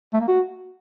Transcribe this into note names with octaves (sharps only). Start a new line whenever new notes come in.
A3
A#3
F#4